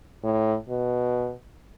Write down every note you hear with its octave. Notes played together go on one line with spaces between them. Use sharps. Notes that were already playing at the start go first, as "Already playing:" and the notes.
A2
B2